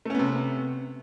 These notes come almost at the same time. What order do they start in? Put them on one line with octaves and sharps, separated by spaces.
A3 C#4 B3 C3